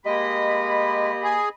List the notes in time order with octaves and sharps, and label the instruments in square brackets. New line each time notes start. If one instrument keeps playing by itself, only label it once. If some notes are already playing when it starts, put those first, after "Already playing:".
[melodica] G#3 [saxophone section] A#3 G4 [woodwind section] D#5 B5
[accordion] G#4